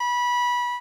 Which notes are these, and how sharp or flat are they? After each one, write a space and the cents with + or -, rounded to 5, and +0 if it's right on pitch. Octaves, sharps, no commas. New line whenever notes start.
B5 -20